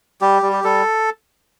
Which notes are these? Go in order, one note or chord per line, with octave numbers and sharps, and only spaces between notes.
G3 G4
G3
G4
G3 A4